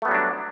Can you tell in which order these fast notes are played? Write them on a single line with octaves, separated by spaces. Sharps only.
A3 B3 G3 F#3 D4